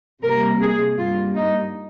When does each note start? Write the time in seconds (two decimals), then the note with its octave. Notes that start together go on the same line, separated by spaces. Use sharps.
0.22 C3 G3 A#3 A#4
0.60 G#4
0.97 G2 G3 A#3 F4
1.35 D#4